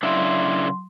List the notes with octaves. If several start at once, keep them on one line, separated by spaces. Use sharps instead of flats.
C#3 F#3 D4 E4 C6